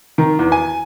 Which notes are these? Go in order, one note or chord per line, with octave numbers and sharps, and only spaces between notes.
D#3
E2
G#5